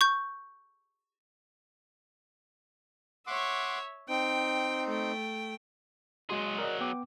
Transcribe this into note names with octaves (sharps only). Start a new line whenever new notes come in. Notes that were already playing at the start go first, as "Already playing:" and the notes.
C#6 G6
C#5 E5 F#5 C6 D6
C4 D#4 G5
A3 G5
F#3 G#3 F#4 G#4 C6
A#4 D5 D#5
B3 G5 D6